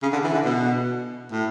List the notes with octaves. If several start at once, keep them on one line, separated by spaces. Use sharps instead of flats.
C#3
D3
E3
D3
B2
A2